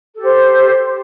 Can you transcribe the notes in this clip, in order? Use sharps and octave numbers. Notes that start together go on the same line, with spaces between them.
G4 A4 C5